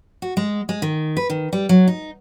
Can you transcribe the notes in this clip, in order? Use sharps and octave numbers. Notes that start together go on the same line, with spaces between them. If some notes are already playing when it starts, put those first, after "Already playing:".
F#4
G#3
G#3
D#3
B4
D#3
G3
F#3
D#4